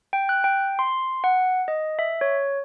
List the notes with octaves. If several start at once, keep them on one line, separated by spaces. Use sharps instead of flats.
G5
F#6
G5
C6
F#5
D#5
E5
C#5